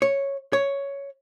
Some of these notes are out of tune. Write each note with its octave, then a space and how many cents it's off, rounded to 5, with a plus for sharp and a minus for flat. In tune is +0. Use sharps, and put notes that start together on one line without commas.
C#5 -5
C#5 +5